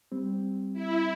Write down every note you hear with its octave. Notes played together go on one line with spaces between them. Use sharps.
G3 C4
E4